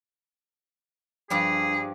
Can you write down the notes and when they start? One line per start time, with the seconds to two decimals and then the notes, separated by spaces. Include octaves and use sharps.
1.30 G2 F3 G3 G#4